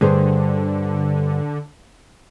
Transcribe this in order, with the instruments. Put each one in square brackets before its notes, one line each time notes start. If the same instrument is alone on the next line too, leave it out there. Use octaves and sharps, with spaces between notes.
[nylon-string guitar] G2 G#4 C5 [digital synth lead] D3